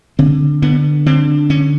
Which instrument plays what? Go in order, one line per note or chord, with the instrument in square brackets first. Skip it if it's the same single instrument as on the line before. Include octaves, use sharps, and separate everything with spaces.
[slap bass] D3 C4
D3 B3
D3 C4
D3 C#4